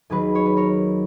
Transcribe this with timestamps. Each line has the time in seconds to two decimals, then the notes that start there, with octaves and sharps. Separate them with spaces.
0.10 D#2 D#3 F#3 G#4 B4
0.35 C#5
0.46 B4
0.56 A#4 C#5